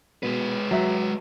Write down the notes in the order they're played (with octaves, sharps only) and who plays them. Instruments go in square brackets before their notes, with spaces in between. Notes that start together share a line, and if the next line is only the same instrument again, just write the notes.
[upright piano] B2 [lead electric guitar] G#3 B4
[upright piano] F#3 E5